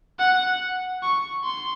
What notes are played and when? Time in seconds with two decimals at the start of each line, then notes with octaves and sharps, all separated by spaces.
0.19 F#5
1.02 C#6
1.44 C6